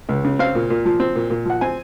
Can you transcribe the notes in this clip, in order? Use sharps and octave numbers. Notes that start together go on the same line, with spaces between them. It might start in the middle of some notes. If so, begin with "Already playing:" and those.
C#2
C#3
C4 F5
A#2
A#2
F3
C4
A#2
A#2
F3 F#5
C4 G#5